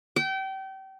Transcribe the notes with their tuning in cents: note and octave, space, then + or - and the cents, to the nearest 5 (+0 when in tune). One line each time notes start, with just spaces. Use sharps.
G5 -30